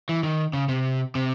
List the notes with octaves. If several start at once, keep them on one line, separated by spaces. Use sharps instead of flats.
E3
D#3
C#3
C3
C3